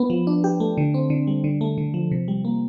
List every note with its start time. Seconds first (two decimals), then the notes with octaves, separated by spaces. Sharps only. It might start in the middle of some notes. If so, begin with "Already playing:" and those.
Already playing: B3
0.10 F3
0.27 D4
0.44 G4
0.60 A3
0.77 D3
0.94 C4
1.10 D3
1.27 G3
1.44 D3
1.61 A3
1.78 D3
1.94 F3
2.12 C3
2.28 G3
2.45 A#3